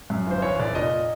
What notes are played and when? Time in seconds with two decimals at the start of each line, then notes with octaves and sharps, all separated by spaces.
0.10 F#2
0.27 G1 C5
0.42 E2 C#5
0.60 F1 D5
0.75 A#2 D#5